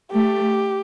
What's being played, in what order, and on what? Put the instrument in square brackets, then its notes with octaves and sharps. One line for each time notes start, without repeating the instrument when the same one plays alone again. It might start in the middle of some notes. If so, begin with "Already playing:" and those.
[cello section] A3 [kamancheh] G4